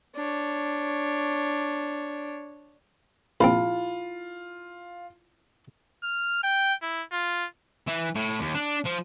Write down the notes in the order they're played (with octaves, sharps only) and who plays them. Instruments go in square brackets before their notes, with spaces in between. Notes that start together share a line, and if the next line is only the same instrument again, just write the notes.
[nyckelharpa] D4 C#5
[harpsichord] A#1 C4 [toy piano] E4 B5 [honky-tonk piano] F4
[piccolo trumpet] F6
G5
E4
F4
[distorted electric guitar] E3
A2
D#2
D4
F3